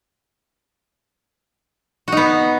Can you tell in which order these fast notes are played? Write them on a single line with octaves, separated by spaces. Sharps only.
F#4 D#4 B3